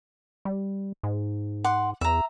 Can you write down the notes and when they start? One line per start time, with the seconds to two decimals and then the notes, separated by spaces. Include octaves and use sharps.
0.45 G3
1.03 G#2
1.64 F#5 C6 D6
2.01 E2 E5 A#5